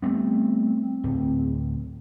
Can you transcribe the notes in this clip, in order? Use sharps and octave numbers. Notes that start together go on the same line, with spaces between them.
G3 A3 B3 C4
D1